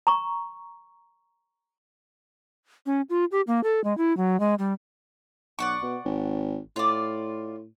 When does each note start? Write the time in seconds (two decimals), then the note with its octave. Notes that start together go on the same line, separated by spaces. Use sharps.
0.07 A#5 C#6
2.86 C#4
3.10 F4
3.32 G4
3.47 A#3
3.64 A4
3.84 G#3
3.98 E4
4.17 F#3
4.40 G#3
4.59 G3
5.59 B1 D5 F#5 C#6
5.83 B2
6.05 G#1
6.76 A2 F4 D5